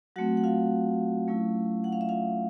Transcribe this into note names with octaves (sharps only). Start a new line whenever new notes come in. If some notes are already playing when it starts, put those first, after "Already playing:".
F#3 A3 C4 F#4 F#5
F#5
F4 F5
F#3 A3 C#4 E4
F#5
F5
E5
F4 F5